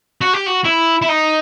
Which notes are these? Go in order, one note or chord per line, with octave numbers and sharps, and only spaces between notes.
F#4
G4
F#4
E4
E4
D#4